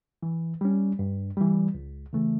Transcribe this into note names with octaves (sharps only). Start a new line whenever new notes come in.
E3
G3 C#4
G2
E3 G3
C#2
C#3 E3 A3